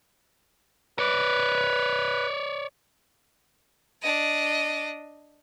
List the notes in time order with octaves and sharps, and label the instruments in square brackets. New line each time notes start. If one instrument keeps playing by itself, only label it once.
[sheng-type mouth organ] B4 [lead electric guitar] C#5 D5
[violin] D4 D#5